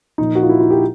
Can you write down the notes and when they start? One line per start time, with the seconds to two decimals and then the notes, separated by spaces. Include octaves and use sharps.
0.18 A#2 F3 D#4
0.35 F#4
0.43 F4
0.49 E4
0.60 F4
0.70 G4